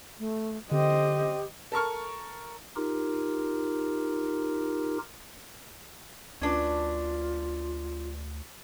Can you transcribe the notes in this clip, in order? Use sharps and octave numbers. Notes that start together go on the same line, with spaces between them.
A3
D3 C4 G4 D#5
A4 A#4 C#6 F6
D#4 F4 G4 A#4
D2 C#4 D4 F4 B4